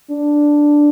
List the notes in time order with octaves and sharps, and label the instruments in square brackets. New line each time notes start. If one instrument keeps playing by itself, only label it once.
[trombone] D4